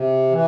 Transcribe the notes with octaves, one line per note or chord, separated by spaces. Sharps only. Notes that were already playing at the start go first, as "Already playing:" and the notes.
Already playing: C3
E3